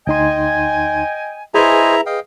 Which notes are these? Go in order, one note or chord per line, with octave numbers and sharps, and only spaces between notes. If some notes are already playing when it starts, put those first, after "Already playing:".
D2 D#4 D#5 G5 G#5 C6
E4 G#4 B4 C5 D#5 E5 G#5 A#5
D#5 F5 G5